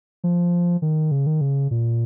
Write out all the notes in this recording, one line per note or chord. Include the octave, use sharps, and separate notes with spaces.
F3
D#3
C#3
D#3
C#3
A#2